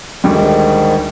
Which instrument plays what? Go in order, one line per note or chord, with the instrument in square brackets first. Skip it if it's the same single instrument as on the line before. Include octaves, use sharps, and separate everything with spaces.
[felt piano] D2 G3 [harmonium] G#2 D#3